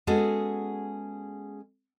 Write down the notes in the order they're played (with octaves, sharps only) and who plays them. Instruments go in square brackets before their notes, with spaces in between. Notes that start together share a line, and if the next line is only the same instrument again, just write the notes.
[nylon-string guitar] G#3 B3 C#4 F#4 G#4 A4